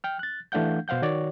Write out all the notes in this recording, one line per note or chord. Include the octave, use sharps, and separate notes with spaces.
G5 F6
F#6 A6
E3 A3 D4 F5 F#5 G6
B2 C5 F5 F#5 G6
D#3 F#4 C#5 D5